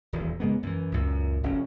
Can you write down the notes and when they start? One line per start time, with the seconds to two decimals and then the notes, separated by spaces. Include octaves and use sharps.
0.13 D#1 E2
0.40 C#3 G#3 A#3 B3
0.63 F#2 E3
0.92 C#2 F#2 A#2
1.43 F1 C#4